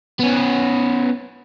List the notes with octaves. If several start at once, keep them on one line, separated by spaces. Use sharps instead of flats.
B3 C#4